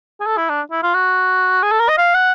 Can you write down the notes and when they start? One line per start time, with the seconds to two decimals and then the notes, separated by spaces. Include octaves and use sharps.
0.20 G#4
0.26 A4
0.37 E4
0.49 D4
0.71 E4
0.83 F4
0.94 F#4
1.63 G#4
1.71 A4
1.80 A#4
1.89 D#5
1.98 F5
2.14 F#5